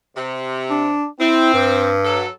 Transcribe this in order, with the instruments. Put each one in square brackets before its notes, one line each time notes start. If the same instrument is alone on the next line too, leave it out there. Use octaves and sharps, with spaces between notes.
[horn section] C3
[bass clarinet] D4
[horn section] C4 [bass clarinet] E4
[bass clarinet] G2
[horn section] F#3 A4